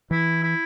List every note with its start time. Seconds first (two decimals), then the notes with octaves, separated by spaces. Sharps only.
0.11 E3 E4
0.43 E4